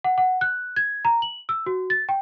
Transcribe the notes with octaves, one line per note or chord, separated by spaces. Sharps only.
F#5
F#5
F#6
G#6
A#5
F#7
E6
F#4
A6
G5